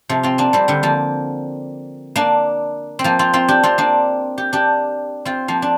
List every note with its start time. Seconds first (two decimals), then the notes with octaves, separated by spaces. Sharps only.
0.09 C3 F3
0.23 C4 F4
0.38 A#3 D4
0.53 G3 C4
0.68 D3 G3
0.83 F3 A#3
2.16 A#3 D4
2.99 C4
3.04 F3 A#3
3.19 C4 F4
3.33 C4 F4
3.48 D4 G4
3.63 C4 F4
3.78 A#3 D4
4.38 G4
4.53 D4 G4
5.25 C4 F4
5.48 F3 A#3
5.62 D4